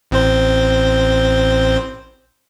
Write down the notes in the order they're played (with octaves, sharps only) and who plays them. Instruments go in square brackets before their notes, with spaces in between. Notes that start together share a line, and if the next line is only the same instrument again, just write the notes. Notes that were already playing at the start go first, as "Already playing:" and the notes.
[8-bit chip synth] A1 C4 C5